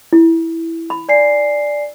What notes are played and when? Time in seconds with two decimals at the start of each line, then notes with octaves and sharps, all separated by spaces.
0.13 E4
0.90 B5
1.09 D5 G#5 C7